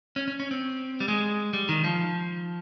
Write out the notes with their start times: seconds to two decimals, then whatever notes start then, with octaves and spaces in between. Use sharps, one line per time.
0.16 C#4
0.28 C#4
0.40 C#4
0.51 C4
1.00 G3
1.08 G#3
1.53 G3
1.69 D#3
1.84 F3